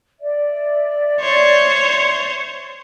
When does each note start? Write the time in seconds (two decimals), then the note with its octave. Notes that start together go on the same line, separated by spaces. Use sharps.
0.20 D5 E5
1.21 C5 C#5